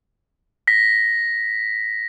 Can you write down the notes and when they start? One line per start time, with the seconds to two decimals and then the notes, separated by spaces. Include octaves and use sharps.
0.67 A#6 B6